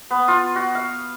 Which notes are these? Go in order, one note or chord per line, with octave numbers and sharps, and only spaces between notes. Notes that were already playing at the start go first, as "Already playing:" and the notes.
B3
F4
F#4
F5